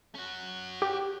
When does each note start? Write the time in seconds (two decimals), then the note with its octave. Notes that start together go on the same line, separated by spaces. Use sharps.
0.15 C#4 F#4
0.82 G4